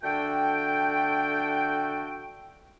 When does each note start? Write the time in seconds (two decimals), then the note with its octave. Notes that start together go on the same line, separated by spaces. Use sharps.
0.03 D3 A3 F#4 A4 G5